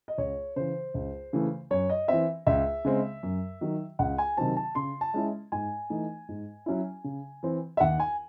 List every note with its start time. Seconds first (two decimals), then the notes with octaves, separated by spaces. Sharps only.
0.08 D#5
0.18 C#2 C#5
0.56 C#3 E3 C5
0.94 C#2
1.33 C#3 E3 A3
1.71 F#2 C#5
1.90 D#5
2.08 E3 C4 E5
2.47 C#2 E5
2.85 C#3 G#3 C4
3.23 F#2
3.61 D#3 F#3
3.99 C#2 F#5
4.18 G#5
4.37 C3 D#3 F#3 C4 A5
4.57 A5
4.75 C#3 C6
5.01 A5
5.14 G#3 C#4 E4
5.52 G#2 G#5
5.90 E3 A3 D#4
6.29 G#2
6.66 F#3 C#4 E4
7.04 C#3
7.43 E3 C4
7.77 E5
7.80 D#2 F#5
8.00 G#5